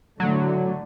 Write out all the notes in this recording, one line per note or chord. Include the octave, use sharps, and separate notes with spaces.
A2 D3 F#3 A3